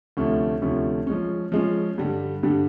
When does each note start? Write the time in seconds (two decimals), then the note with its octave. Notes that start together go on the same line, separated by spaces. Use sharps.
0.17 D2 C3 F3 A3 C#4
0.62 D2 C3 F3 A3 C#4
1.07 F3 G#3 C#4
1.52 F3 G#3 C#4
1.98 G2 D3 G3
2.43 G2 D3 G3